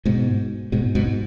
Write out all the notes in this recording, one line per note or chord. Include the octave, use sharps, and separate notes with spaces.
G#2 B2
G#2 B2
G#2 B2